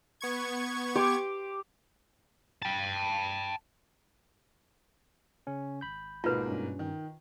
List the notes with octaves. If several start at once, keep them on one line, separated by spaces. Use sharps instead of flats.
B3 C#6 G#6
G4 C6 D6
G5 A5
C#3 C#4
G#1 B5 G6
G#2 B2 A#3 F4 B4
G2 C#4
D#3